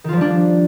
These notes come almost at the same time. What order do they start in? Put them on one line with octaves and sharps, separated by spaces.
D#3 F4 F3 G3 D4